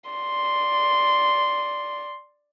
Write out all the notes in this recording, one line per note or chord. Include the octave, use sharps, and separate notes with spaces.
D5 C6